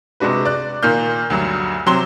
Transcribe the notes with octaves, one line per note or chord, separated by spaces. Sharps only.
C3 G#3 D4 F#4 B4
D5 F#6
A#2 D#3 A#3 F6 G6
D2 G2 F#3
C3 F#3 C4 C6 G7